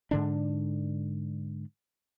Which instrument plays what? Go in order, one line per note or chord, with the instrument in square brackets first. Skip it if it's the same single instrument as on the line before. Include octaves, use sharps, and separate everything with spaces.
[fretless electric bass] G#2 D3 D4